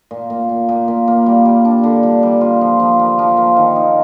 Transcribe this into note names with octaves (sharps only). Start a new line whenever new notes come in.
A#2
A#2
A#2
A#2
A#2
A#3
G3
G3
D4
D3
G3
G3
F4
F3
F3
A#3
F3
A#3
D#3
D#4